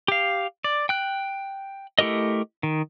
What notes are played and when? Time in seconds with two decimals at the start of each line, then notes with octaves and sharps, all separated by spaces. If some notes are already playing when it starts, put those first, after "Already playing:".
0.08 G4 F5
0.64 D5
0.89 G5 F#6
1.99 A3 E4 G4 A#4 D#5
2.63 D#3